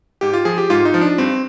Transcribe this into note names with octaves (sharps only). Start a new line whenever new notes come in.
G#2 G4
F4
F3 G#4
G4
G#2 F4
D#4
F3
D4
G2 C4